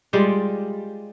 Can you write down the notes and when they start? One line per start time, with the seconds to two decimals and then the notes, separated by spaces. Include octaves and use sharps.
0.13 G3 G#3 F4 D5